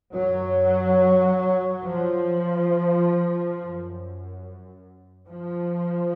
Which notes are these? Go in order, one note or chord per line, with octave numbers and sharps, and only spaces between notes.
F#2 F#3
F3
F#2
F3